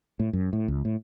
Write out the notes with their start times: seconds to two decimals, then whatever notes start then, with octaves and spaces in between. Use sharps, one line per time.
0.20 A2
0.33 F#2
0.53 A2
0.68 C#2
0.85 A2